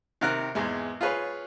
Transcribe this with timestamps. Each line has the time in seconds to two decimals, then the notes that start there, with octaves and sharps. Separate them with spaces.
0.21 C3 D#3 A#4 F6 F#6
0.55 G#1 E2 G#3
1.01 F4 G#4 B4 C#5